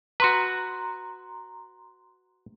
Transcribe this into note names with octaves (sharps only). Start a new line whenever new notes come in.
F#4 B4 A#5 C6